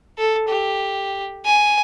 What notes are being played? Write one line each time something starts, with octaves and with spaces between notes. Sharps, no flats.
A4
G4
G#5